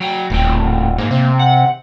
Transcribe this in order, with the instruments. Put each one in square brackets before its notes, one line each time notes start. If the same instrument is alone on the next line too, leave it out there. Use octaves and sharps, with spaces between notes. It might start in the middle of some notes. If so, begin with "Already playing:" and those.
[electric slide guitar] F#3 G5
[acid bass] D#1 [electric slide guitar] A2 C4 G5
[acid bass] G#2 [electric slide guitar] A#3
[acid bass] C3
[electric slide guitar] F#5